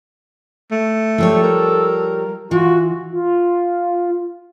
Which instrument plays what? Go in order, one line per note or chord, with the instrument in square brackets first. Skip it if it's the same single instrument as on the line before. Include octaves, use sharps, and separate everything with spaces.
[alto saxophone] A3
[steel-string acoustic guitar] F3 G3 C#5 [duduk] A4
[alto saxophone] A#4
[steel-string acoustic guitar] E3 [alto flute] F4 [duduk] F#4
[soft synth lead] F4